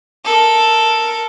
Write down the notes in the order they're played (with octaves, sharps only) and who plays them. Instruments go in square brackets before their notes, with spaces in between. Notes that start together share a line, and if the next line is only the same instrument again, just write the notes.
[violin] A4 A#4